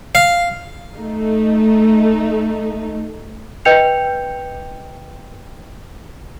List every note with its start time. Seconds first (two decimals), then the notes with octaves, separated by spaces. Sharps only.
0.15 F5
0.97 A3 D#4
3.65 B4 D#5 G5 G6 C#7 F7